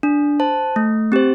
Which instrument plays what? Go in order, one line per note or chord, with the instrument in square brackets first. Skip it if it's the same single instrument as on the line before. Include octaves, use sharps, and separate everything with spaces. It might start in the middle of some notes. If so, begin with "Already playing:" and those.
[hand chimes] D4
C5 A5
A3
C4 G4 C5